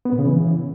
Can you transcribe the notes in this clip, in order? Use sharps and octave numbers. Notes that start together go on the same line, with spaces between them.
B3
A#2
C#3
E3